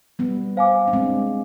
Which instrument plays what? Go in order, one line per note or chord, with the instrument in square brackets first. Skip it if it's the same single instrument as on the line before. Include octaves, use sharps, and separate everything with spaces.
[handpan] G3 B3
[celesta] C5 F5 G#5 D6
[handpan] D4
G#3 C4